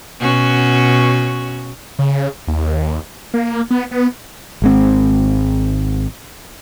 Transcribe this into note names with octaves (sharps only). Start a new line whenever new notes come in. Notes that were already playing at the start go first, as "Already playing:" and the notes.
B2 C#4 F#4
C#3
D#2
A#3
B3
B3
G#1 G#3 C4